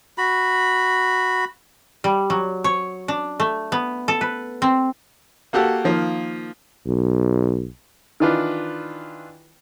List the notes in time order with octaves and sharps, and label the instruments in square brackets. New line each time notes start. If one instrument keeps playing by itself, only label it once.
[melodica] F#4 B5
[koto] G3
F#3
C#5
D4
A3
B3
A4
B4
C4
[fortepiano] A#3 F#4 G4 A4 F#5
D#3 F3 A#3
[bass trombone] B1
[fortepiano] D#3 E3 D4 F4 B4